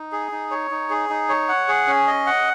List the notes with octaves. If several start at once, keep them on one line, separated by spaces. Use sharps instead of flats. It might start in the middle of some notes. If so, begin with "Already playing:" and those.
Already playing: D#4
G#4
D#4
C#5
D#4
G#4
D#4
C#5
F#5
G#4
C#4
D#5
F#5